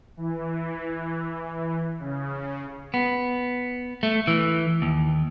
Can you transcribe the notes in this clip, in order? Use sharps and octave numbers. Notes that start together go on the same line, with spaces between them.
E3
C#3
B3
A3
E3
D#2